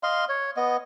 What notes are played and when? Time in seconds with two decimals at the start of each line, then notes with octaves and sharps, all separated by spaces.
0.03 D#5 F5 C6
0.29 C#5
0.57 B3 D#5